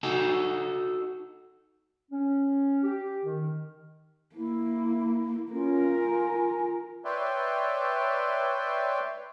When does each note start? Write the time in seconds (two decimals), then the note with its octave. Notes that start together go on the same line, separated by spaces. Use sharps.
0.03 D#4 F#4 A4
2.11 C#4
2.83 G4
3.24 D#3
4.36 A#3 E4
5.52 C#4 F4 A#4
5.98 G#5
7.05 B4 C#5 D5 E5 G5 C6